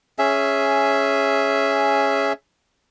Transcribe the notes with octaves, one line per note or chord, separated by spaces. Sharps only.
C#4 G#4 E5